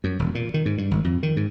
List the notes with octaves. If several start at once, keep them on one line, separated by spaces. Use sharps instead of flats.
F#2
E1
A#2
D#3
G#2
G2
G#1
F2
D#3
G#2